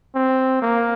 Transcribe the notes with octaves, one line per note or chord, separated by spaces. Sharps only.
C4
A#3